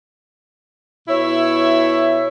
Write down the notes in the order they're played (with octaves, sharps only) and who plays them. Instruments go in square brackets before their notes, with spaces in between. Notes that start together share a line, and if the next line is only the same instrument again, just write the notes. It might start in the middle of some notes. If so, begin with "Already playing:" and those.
[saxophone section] B2 E4 C#5 E5